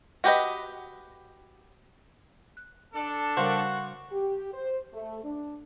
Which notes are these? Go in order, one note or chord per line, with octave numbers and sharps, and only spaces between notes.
F#4 G4 B4 D#5
F#6
D4 A4
C#3 G3 F#4 A#4 C5 F5
G4
C5
A3
D4